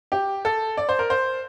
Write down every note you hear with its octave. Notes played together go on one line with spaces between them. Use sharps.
G4
A4
D5
C5
A#4
C5